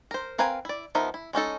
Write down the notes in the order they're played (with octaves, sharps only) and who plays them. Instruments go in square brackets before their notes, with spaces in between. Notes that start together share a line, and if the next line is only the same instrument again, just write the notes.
[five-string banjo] A#4 C5
C4 A#4 B4 F5 G#5
E4 D5
F3 B3 D#4 A#4 E5
E4
G#3 C#4 D#4 A4